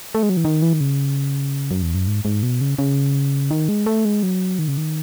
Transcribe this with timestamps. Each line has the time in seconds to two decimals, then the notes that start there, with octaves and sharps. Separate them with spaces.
0.15 A3
0.23 G#3
0.29 F#3
0.37 E3
0.45 D#3
0.62 E3
0.73 D#3
0.81 C#3
1.71 F#2
1.82 E2
1.95 F#2
2.07 G#2
2.25 G#2
2.43 B2
2.61 C#3
2.79 C#3
3.51 D#3
3.69 G#3
3.86 A3
4.05 G#3
4.23 F#3
4.59 D#3
4.68 C#3
4.78 D#3